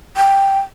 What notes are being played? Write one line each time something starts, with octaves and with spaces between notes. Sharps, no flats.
G5